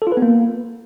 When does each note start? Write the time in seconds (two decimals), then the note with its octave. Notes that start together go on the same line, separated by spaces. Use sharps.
0.02 A4
0.07 F4
0.12 B4
0.17 B3
0.22 A#3